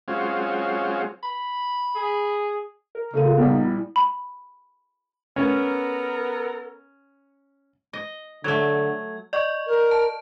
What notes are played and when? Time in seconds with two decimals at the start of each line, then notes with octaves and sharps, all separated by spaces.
0.08 F#3 G#3 C4 C#4 F4
1.23 B5
1.96 G#4
2.95 A#4
3.13 C#3 A3 A#3 D#7
3.25 F4
3.38 A#1 G3 B3
3.50 D#4
3.65 E4
3.96 B5
5.36 B3 C#4 A4 A#4
7.93 D#5
8.44 D3 F#3 A3 G#6
9.33 D5 D#5 C#6
9.66 A#4
9.91 A5